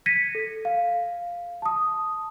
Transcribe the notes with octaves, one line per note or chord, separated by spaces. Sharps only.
G#6 A#6 B6 C#7 D#7
A4
F5
A5 D#6